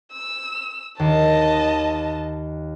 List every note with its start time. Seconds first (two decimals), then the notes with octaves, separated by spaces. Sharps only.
0.13 E6
0.99 D#2 D#5 A5